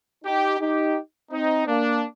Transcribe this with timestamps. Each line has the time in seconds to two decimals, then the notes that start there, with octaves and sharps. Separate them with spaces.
0.25 D#4 G4
0.60 D#4 G4
1.32 C4 D#4
1.67 A#3 D4